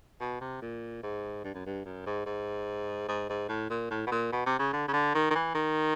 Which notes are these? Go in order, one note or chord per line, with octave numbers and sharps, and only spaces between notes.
B2
C3
A#2
G#2
G2
F#2
G2
F#2
G#2
G#2
G#2
G#2
A2
A#2
A2
B2
A#2
B2
C3
C#3
D3
C#3
D3
D#3
D#3
E3
D#3